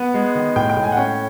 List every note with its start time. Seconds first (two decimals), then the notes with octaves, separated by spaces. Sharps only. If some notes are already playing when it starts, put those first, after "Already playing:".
Already playing: B3 F#5
0.14 G#3
0.35 D#3
0.56 A2 G5
0.69 G5
0.77 A2
0.83 G#5
0.92 F#5
0.97 C#4 G5